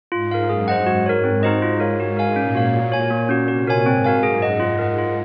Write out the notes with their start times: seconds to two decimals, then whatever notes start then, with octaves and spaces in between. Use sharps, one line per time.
0.12 G#2 F4
0.31 A#4 F5
0.49 F#2 G#4
0.68 C5 D#5 F#5
0.86 G#2 F#4
1.06 A#4 C#5
1.24 C4
1.43 D#4 F#4 C5 D#5
1.62 G#2 F4
1.80 A#4 C#5 F5
2.00 F#4
2.17 A#4 F5 G#5
2.36 A#2 C#4
2.55 F#4 C#5 F5
2.74 F#4
2.92 C#5 G#5
3.10 A#2 A#3
3.29 C#4 F#4
3.48 C3 F#4
3.67 A#4 C#5 G#5
3.86 G#2 C4
4.04 F#4 A#4 F5 G#5
4.23 F#2 G#4
4.42 D#5 F#5
4.60 G#2 F4
4.79 A#4 D#5 F#5
4.98 F4